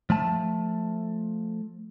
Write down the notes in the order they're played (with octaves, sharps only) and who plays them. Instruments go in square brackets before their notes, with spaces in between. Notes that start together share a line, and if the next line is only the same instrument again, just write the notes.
[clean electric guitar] F3 A3 A5